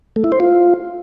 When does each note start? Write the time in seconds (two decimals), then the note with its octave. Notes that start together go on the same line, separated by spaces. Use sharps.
0.16 A3
0.24 E4
0.32 C5
0.40 F4